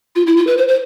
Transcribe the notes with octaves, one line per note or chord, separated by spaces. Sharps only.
F4
E4
F4
B4
C5
C5